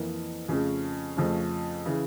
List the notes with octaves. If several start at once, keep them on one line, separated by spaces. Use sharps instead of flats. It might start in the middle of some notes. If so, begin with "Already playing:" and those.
Already playing: F2 E3 A#3
F2 C#3 F3 A3 C#4
F2 C#3 F3 A3 C#4
C#3 E3